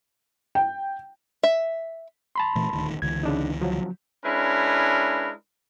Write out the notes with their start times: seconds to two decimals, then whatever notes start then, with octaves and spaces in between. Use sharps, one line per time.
0.55 G5
1.43 E5
2.36 A5 B5 C6
2.55 A#2 E3 A3
2.71 D#1 D2 D#3
3.02 C#2 D3 E3 G#6
3.23 C#3 D4 D#4
3.61 F3 F#3
4.25 G#3 C#4 D4 E4 A#4 B4